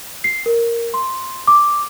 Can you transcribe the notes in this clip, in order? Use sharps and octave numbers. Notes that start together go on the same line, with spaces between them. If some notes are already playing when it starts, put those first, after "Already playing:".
C7
A#4
C6
D6